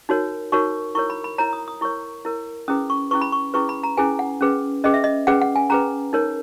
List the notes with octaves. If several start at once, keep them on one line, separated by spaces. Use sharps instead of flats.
D#4 F#4 A#4 C#5
D#4 F#4 A#4 C#5 C#6
E4 A#4 C#5 C#6
B5
B5
E4 A#4 C#5 A#5
D#6
D#6
E4 A#4 C#5 C#6
E4 A#4 C#5
C#4 E4 G#4 B4 D#6
C#6
C#4 E4 G#4 B4 C#6
B5
C#6
C#4 E4 G#4 B4 C#6
B5
A#5
C#4 E4 G#4 B4 G#5
F#5
C#4 G#4 B4
C#4 G#4 B4 D#5
E5
D#5
C#4 G#4 B4 F#5
F#5
G#5
C#4 G#4 B4 A#5
D#4 A#4 C#5